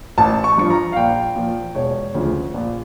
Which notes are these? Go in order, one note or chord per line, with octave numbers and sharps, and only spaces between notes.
A1 A5
C#6
G2 F3 C#6
A#5
F5
A#1 G5
A#2 F3
E1 C#5
D2 C#3 F3
A#1